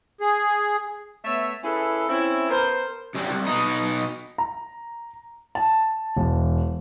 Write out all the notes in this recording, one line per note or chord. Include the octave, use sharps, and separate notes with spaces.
G#4
A3 B3 C#5 E5
C#4 E4 G#4 A4 B4
C4 C#4 E4
B3 A#4 C5
F#2 G3
C2
B2 D#4
A#5
A5
E1